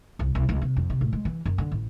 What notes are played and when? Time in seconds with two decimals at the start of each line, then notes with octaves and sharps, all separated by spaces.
0.19 C2
0.35 C2
0.49 C#2
0.62 C3
0.77 F2
0.90 C3
1.01 A2
1.13 G#3
1.25 E3
1.46 F#2
1.58 D3
1.72 A1